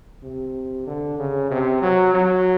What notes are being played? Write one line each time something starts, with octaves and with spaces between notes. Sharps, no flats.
C3
D3
C#3
C3
F#3
F#3